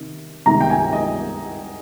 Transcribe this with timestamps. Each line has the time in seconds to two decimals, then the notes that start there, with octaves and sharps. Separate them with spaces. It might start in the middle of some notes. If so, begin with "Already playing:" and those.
Already playing: C3 D#3
0.46 C#2 C3 D#3 A#5
0.61 G5
0.70 G#5
0.93 D#5